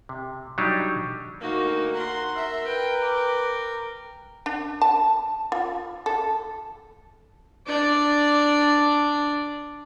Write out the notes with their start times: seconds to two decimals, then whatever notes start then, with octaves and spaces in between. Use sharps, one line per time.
0.09 C3
0.58 F#3 G3 D4 D#4 G4
1.41 D2 A#3 D#4 F#4
1.94 A#4 F#5 C6
2.36 A#4 E5
2.65 B4 G5
3.01 G5 D6
4.46 D4
4.82 A5
5.52 F4
6.06 A4
7.67 D4 D5